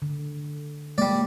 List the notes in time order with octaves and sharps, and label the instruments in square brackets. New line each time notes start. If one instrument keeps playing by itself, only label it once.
[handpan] D3
[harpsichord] G3 D5 [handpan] G#3 A#3